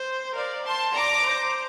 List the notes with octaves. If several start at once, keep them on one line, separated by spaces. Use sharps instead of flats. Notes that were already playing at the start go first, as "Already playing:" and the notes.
Already playing: C5
A#4 D5 F5
C5 A5 C6
D5 A#5 D6
C5